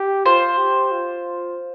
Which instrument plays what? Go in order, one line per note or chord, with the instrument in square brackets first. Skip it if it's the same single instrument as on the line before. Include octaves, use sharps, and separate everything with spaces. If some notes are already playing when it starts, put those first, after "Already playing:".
Already playing: [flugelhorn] G4
[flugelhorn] F4 [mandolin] C5
[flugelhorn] G4
F4